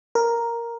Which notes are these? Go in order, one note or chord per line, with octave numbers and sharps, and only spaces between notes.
A#4